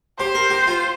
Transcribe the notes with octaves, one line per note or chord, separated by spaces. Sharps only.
G4 C5
A#4
G4
F4